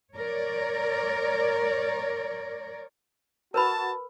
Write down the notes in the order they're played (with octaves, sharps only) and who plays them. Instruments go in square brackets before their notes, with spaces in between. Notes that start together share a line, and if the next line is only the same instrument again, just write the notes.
[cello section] A#4 C#5 D5
[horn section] F#4 A5 [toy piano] A#4 B4 B5